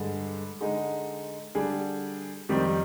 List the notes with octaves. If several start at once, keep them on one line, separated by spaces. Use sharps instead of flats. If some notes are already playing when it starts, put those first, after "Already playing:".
Already playing: G2 D3 G#3
D3 G#3 D#4
D3 G3 D4 G#4
F2 D#3 G3 C4 G4